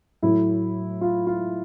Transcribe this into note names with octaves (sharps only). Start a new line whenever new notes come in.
A2 F#3 A3 E4
F4
F4